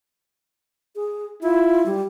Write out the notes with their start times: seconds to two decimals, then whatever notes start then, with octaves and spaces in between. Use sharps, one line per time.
0.95 G#4
1.42 E4 F4
1.86 G3